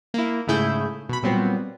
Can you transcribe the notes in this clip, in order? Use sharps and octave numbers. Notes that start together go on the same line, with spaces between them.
A#3 E4
G#2 C#3 A3 E4 G#4 G6
B2 B5
A#2 F#3 G3 B3 C4